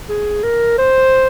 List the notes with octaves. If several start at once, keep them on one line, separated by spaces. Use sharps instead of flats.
G#4
A#4
C5